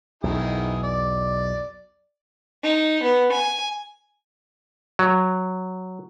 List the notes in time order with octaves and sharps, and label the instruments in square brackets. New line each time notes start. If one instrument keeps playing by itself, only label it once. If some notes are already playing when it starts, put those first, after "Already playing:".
[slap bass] B1 E2 B2 [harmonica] D#3 E4 G#4
[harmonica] D5
[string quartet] D#4
B3
G#5
[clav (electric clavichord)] F#3